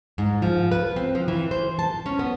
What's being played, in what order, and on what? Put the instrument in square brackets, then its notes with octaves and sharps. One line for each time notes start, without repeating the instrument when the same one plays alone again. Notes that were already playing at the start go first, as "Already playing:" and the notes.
[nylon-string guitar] G#2
F3
B4
C4
F3
E3
C5
A5
C#4
B3